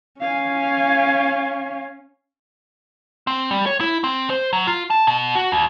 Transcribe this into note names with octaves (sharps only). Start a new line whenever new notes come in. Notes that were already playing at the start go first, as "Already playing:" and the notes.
C#4 F5 G#5
C4
G3
C#5
E4
C4
C5
F#3
F4
A5
B2
F#4
D#2